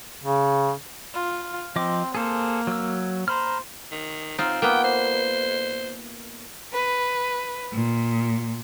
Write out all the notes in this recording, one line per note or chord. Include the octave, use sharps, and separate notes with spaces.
C#3
F4
F3 C4 D#5 D6
A#3 G#4 A4 C5
F#3 E6
C5 A#5 B5 F6
D#3
C4 D#4 F4
A#3 B3 G5
C5
B4
A#2